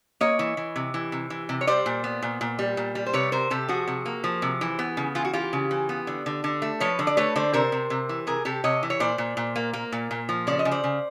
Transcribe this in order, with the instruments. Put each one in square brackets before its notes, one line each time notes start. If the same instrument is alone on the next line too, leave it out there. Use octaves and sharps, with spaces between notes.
[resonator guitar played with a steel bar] A#3 C#5 D#5
E3
E3
C3
E3
C3
E3
C3
C#5
G3 C5 D5
A#2
B3
A#2
A#2
G3
A#2
G3
C5
C3 B4 C#5
C3 A#4 C5
C3 G4 A4
F3 F#4 G#4
C3
A#3
F3
C3
E3
B3
C#3
E3 F4
F#4
E3 F4 G4
C#3
E3
B3
D3
D3
D3
A3
F3 B4 C#5
D3
D5
A3 B4 C#5
D3 C5 D5
C3 A#4 C5
C3
C3
E3
C3 G#4 A#4
C3 G4 A4
C3 C#5 D#5
E3
C#5
A#2 C5 D5
A#2
A#2
A#3
A#3
A#2
A#2
F3
C#3 D5
D#5
C#3
C5 D5
C#3